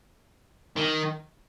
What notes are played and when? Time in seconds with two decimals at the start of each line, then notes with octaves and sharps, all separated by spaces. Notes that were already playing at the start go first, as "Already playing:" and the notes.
0.77 D#3